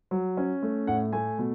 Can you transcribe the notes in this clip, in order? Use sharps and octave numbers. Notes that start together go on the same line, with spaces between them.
F#3
C#4
A3
A2 F#5
A3 G#5
B2